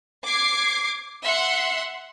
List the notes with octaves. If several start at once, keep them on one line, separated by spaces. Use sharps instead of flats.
D6 G#6 C7
E5 F#5 C6